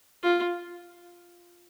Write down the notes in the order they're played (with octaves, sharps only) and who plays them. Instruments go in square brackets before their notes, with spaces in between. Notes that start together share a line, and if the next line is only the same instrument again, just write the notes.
[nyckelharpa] F4